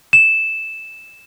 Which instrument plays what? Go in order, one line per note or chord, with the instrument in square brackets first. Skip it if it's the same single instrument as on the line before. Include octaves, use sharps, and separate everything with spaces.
[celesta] E7